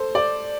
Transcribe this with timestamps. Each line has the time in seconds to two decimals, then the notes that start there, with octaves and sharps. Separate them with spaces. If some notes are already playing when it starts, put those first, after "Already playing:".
Already playing: A4 C5
0.15 D5